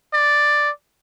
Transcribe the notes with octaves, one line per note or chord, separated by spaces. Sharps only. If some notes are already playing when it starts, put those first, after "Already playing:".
D5